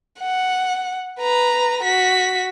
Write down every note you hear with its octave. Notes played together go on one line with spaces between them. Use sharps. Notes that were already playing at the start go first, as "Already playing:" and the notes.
F#5
B4 A#5
F#4 B6